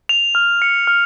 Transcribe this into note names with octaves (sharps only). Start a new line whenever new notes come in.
F7
F6
C#7
F6